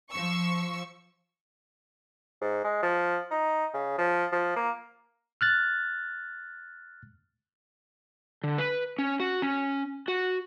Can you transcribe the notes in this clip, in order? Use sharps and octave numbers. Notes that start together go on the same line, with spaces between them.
F3 C#6 E6
G#2
G#3
F3
D#4
C#3
F3
F3
A#3
F6 F#6 A6
D3
B4
C#4
F#4
C#4
F#4